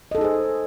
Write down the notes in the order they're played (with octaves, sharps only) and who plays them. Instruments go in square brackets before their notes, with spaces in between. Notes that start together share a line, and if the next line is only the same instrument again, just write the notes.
[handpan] D#5
A4
D#4
G#4
C5